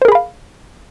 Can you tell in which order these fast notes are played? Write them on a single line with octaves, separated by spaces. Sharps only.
C5 A#4 G#4 B5 F5